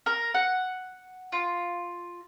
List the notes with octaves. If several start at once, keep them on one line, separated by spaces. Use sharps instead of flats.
A#4
F#5
F4